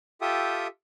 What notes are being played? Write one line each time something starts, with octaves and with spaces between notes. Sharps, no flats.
F4 G4 A4 E5 G5 D#6